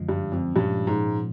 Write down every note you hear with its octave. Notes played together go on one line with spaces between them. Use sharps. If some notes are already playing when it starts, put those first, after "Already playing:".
Already playing: F#2 D3 F3 G#3
G2
F2
G2 A#2 F3 G#3 C#4
G#2